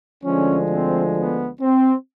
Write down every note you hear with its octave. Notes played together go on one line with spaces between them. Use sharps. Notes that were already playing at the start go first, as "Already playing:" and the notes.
D2 D3 F3 G#3 C#4
C4
B3
C4